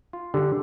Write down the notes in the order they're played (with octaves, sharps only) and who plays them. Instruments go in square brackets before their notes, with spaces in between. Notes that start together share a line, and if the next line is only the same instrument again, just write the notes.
[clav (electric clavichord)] F4
[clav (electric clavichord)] D3 [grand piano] G4